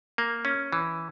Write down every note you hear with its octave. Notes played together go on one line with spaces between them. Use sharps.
A#3
C#4
E3